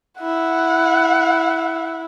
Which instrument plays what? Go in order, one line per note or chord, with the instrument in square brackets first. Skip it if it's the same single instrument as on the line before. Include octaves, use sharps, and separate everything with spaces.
[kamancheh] E4 [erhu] F#5